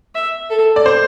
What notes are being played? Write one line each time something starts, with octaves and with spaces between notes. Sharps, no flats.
E5
A4
D5
C5